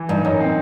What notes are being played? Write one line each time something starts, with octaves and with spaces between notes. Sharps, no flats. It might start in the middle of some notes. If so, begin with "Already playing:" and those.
Already playing: E3
G2 D#4
F#2 D#4
C4